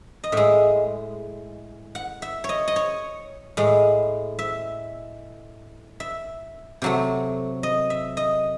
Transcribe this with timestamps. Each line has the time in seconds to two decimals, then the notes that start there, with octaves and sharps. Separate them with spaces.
0.24 D#5
0.32 A2 G#3 E5
1.95 F#5
2.22 E5
2.44 C#5
2.49 D#5
2.68 D#5
2.76 C#5
3.57 A2 G#3
4.39 E5
6.00 E5
6.82 C3 F#3 A3
7.63 D#5
7.90 E5
8.17 D#5